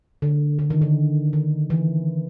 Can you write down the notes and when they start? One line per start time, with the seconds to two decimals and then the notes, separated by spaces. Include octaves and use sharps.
0.22 D3
0.59 D3
0.70 D#3
0.82 D3
1.33 D#3
1.70 E3